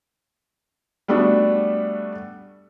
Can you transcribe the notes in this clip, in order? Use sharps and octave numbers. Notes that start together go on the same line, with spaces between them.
G3 A3 B3 D4 F#4